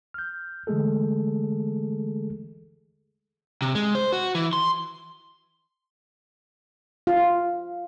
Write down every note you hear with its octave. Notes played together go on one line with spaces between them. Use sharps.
F6 G6
D3 E3 G#3 A3 G#4 A4
C3
G#3
C5
F#4
E3
C6
F4